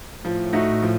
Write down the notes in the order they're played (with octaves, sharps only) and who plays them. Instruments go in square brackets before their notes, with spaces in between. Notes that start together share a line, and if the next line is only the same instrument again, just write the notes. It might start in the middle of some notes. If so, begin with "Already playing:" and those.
[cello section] A2 [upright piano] F3
[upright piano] A3 D#4 F#4
F3